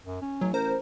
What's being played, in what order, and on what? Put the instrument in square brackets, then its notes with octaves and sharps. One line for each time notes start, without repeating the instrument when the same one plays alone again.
[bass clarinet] F#2
C#4
[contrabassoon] A1 [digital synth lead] F#3
[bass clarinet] A#4 [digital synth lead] C5